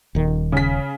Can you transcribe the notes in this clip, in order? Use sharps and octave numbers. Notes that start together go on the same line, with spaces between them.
D#1 D#3
C#3 B6